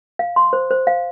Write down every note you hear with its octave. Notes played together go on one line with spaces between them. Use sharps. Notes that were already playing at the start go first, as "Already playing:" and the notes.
F5
C6
C5
C5
F5